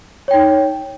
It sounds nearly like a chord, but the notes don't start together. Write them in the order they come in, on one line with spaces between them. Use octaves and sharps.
C#5 G5 D#4